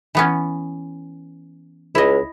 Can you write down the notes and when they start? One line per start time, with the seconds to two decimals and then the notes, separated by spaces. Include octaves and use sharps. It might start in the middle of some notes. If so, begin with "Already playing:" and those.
0.15 E3 B3 C#4
1.95 C#2 E4 D#5